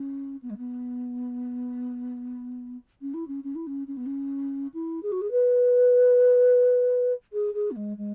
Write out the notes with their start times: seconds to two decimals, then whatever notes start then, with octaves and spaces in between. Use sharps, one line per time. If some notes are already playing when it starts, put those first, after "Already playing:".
Already playing: C#4
0.42 B3
0.50 G#3
0.57 B3
3.01 C#4
3.14 E4
3.27 C#4
3.44 C#4
3.55 E4
3.66 C#4
3.87 C#4
3.97 B3
4.06 C#4
4.74 E4
5.02 G#4
5.12 F#4
5.21 G#4
5.31 B4
7.33 G#4
7.54 G#4
7.71 B3
7.76 G#3
7.97 G#3